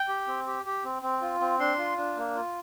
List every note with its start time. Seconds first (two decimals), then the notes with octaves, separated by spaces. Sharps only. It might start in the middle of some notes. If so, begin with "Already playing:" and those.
Already playing: G5
0.08 G4
0.27 C4
0.47 G4
0.65 G4
0.84 C4
1.02 C4
1.22 F4
1.40 C4
1.60 D4 C6
1.78 F4
1.97 D4
2.17 A#3
2.35 F4